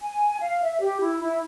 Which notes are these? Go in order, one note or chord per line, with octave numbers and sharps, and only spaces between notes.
G#5
F5
E5
G4
E4
E4